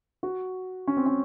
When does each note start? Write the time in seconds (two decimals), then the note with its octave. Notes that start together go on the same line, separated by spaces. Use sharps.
0.23 F#4
0.88 C#4
0.97 C4
1.06 C#4